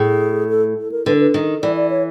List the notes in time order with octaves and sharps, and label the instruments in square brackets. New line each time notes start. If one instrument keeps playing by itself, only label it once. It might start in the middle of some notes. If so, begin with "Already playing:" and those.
Already playing: [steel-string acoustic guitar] A2 [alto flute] G#4
[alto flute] A4
A4
A#4
[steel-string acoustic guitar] D3 [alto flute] B4
[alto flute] A#4
B4
[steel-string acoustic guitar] D#3
[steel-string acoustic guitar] E3 [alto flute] D5
[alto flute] D5
C#5